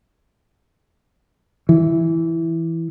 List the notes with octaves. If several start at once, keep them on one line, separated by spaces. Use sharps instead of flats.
E3